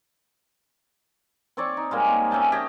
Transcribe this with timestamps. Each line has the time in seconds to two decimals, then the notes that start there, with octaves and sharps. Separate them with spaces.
1.57 C4 C#5 D5 C#6
1.77 D#4
1.91 G3 G#3 A#3
2.31 C#4 E5 G5 A5
2.52 G4 C#5 D#5 G5